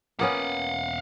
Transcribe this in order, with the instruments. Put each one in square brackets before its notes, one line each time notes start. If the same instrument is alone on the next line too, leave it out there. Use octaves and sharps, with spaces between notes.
[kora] A#3 B3 C#4 [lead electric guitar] F5 F#5